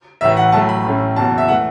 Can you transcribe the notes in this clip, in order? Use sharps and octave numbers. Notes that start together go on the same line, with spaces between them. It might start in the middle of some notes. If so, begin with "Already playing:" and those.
A1 A2 E3 E5
F#5
A1 A2 F#3 A3 A5
B5
A1 A2 A3 C#4
F#1 E2 B2 A5
E5
E3 A3 F#5